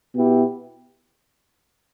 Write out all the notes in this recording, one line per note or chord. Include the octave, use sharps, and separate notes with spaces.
B2 B3 E4 G4